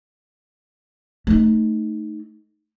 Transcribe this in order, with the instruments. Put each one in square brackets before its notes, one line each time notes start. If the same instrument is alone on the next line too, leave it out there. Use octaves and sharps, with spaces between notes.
[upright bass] A3 D#4